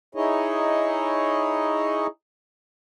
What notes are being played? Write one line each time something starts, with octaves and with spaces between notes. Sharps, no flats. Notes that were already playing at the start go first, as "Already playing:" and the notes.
D#4 E4 G#4 C#5 D#5